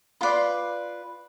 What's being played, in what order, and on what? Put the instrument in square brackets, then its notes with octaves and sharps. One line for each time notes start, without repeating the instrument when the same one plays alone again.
[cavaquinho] F4 B4 D5 C6